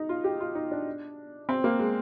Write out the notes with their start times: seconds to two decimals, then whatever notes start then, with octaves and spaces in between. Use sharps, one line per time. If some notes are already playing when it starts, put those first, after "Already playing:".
Already playing: D#4
0.09 F4
0.24 G4
0.40 F4
0.55 D#4
0.71 D4
1.49 C4
1.64 A#3
1.79 G#3